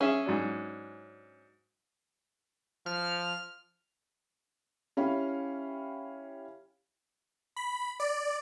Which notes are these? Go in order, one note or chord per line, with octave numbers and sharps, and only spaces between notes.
C#4 G#4 E5
G#2 F#3 D4
F3 F6
C#4 E4 G4 F5 B5
B5
D5